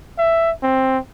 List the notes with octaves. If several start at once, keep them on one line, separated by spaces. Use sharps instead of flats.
E5
C4